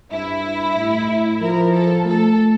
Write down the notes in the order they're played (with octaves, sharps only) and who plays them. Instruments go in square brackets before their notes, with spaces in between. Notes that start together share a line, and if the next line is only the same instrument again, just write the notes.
[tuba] G2 [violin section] E4
[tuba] A2
[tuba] F3 [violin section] A#4
[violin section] A4
[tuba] A3 [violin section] A4